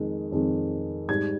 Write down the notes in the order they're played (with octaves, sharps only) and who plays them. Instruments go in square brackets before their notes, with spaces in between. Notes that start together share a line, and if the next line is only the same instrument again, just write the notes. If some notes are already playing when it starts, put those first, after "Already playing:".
Already playing: [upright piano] F2 D#3 G#3
F2 D#3 G#3
G#2 G3 G#6